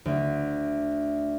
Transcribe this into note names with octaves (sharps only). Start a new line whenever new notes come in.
D2